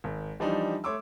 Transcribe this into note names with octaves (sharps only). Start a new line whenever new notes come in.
G#1
E3 F3 G3 D4 D#4
A3 C#5 C6 D6 E6